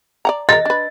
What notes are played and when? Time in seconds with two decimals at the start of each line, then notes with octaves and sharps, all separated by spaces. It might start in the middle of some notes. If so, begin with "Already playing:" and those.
0.25 D5 F#5 A#5
0.49 G#4 A#4 D#5 A6
0.65 D4 B4